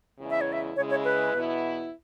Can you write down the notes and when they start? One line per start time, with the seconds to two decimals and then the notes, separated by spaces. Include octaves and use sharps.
0.19 E2 C#3 G#3 E4
0.30 E5
0.41 C#5
0.52 E5
0.76 C#3 G#3 E4 C#5
0.90 C#5
1.05 B4
1.33 E2 B2 B3 E4